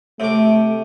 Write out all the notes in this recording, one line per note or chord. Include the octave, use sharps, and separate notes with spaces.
C3 A3 D6